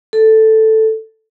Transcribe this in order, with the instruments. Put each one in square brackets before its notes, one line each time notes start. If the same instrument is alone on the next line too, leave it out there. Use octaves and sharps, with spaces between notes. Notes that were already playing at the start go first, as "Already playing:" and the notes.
[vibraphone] A4